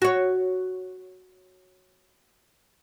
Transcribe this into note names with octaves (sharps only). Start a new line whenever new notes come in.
F#4 C#5